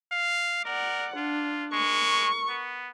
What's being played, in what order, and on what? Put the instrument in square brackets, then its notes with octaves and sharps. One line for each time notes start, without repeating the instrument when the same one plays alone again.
[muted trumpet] F5
[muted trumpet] A#4 [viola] D5 F#5
[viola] D4 [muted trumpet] F4
[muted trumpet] G#3 [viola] A#4 C#6
[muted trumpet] B3